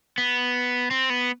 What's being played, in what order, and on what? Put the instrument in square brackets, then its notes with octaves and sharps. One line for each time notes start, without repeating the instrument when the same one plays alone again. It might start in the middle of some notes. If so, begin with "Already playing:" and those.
[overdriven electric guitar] B3
C4
B3